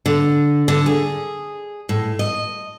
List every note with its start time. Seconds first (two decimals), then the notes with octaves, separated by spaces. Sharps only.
0.06 D3
0.68 D3
0.86 G#4
1.89 A2
2.19 D#5